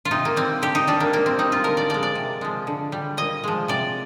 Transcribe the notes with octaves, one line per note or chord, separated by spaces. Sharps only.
F4
C3 D#4
A#3
G3 C4
D3 G4
D#4
G3 D4
A#3
A#2 A#3
C4
G3 D#4
F4
D3 A#4
D5
F3 G#3 D5
D5
C3
F3 G#3
D3
G3
A#2 D#5
F3 G#3
C3 D5